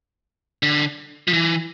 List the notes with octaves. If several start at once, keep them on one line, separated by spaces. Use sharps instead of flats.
D3
F3
E3